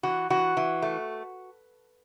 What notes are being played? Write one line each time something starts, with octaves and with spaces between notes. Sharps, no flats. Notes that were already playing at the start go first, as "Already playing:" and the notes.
E3 F#4
E3 F#4
E3
A3